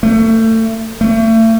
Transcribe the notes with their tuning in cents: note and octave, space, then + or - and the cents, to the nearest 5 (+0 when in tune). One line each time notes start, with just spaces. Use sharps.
A3 +30
A3 +35